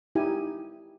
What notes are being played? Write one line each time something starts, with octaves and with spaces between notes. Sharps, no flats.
D#4 E4 G4 G#5